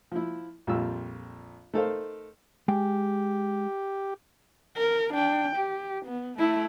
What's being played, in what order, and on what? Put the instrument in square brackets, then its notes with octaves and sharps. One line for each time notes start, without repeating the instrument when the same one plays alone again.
[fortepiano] F3 E4
A#1 F2 G3 F4 E6
A3 D#4 A4 A#4 C5 F5
[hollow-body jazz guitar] G#3 G5 [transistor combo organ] G4
[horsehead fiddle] A#4
D4 G5
G4
B3
A3 E4